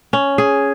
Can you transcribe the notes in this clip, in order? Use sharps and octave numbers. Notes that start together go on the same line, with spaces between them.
C#4
G#4